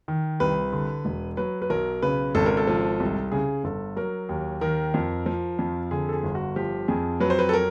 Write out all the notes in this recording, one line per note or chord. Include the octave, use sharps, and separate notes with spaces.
D#3
C2 B4
D3
E1
F#3 B4
B4
B1 A#4
C#3 B4
G#1 A4
A#4
A4
F3
C2
C#3 G#4
G1 A4
F#3 A#4
D#2
D#3 A#4
F2
F3
F2
D3 G#4
A4
G#4
G1
F#4
F3 G4
F2 G#4
F#3 B4
C5
B4
A4
A#4